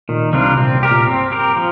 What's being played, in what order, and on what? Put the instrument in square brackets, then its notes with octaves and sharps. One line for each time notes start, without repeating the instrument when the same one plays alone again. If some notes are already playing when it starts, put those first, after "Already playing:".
[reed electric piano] A#2 [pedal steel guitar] D#3
[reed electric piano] C2 C3 [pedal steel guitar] G3 D4 F4 A#4
[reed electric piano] A#2 [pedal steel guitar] C4
[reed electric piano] C2 C3
[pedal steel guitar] G4 A#4
[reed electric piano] A#2
[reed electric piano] G2 [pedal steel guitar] C4
[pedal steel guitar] G4 A#4
F3